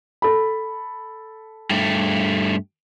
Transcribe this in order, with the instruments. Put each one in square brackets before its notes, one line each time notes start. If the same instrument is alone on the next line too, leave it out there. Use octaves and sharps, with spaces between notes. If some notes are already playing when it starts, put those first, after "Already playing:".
[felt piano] A4 B5
[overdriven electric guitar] G2 A3